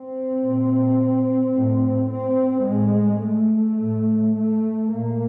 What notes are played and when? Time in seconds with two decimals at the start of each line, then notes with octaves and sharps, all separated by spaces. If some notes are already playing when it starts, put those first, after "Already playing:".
Already playing: C4
0.41 A#2
1.53 A2
2.09 C4
2.65 A2 G#3
3.21 A3
3.77 A2
4.34 A3
4.90 A#2 A#3